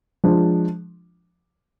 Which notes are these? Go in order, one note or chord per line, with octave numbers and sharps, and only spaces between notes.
F3 G#3 D4